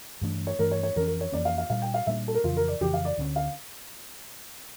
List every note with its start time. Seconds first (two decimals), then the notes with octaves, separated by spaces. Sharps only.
0.21 G2 E3 A3 D4
0.47 C#5
0.59 G2 E3 A3 D4 A#4
0.71 C#5
0.83 C#5
0.96 F2 E3 A#3 C#4 A#4
1.08 A#4
1.21 C#5
1.32 F2 E3 A#3 C#4 D5
1.45 F5
1.58 F5
1.70 A#2 G3 A#3 D4 F5
1.82 G5
1.94 F5
2.07 A#2 G3 A#3 D4 E5
2.28 A4
2.34 A#4
2.44 F2 C#3 E3 F4
2.57 A#4
2.68 D5
2.81 F2 C#3 E3 G4
2.94 F5
3.05 D5
3.18 D2 D3 F3 C#4
3.36 F5